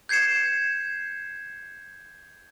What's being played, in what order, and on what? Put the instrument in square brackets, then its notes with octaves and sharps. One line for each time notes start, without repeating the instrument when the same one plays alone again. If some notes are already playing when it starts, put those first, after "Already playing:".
[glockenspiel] G6 G#6 C7 C#7 E7